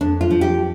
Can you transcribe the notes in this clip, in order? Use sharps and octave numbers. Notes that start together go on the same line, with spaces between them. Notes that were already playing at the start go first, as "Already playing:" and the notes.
F2 D4
F4
F3
G4